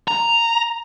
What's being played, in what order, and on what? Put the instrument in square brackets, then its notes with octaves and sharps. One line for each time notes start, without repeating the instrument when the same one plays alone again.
[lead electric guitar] A#5